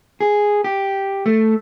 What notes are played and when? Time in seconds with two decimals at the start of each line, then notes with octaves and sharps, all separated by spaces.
0.21 G#4
0.64 G4
1.26 A3